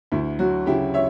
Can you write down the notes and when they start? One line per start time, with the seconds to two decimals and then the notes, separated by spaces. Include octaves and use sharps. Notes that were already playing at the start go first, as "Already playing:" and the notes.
0.12 D2 E4
0.39 F#3 F#4
0.66 C#3 E4 G4
0.94 C#5 E5